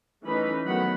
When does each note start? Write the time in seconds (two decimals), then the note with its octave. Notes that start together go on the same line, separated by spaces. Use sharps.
0.24 E3 A3 C#4 D#4 B4 B5
0.65 D#3 F#3 A3 B3 F#5 B5